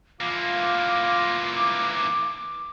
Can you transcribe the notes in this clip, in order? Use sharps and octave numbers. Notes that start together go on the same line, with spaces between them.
E3 A#3 F4 D6